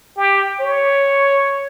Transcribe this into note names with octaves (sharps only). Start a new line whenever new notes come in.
G4
C#5